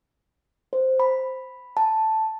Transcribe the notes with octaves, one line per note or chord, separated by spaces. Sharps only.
C5
B5
A5